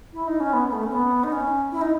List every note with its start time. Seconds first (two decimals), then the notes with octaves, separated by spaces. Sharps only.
0.13 E4
0.27 D#4
0.40 C#4
0.53 B3
0.68 B3
0.72 A3
0.83 C#4
0.92 B3
1.24 D#4
1.32 C#4
1.72 E4
1.81 D#4